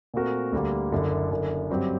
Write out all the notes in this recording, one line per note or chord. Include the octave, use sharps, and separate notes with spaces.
A#2 A3 C4 F#4 A#4
D2 D3 G3 A#3
F#1 F#2 D3
F#1 F#2 D3
G2 F#3 C4 G4